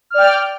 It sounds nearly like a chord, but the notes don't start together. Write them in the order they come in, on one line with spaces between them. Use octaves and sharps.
F6 D5 G5